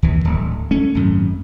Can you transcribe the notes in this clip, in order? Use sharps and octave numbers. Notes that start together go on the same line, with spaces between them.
D#2 E3
D1
A3 C#4
G#1 F#2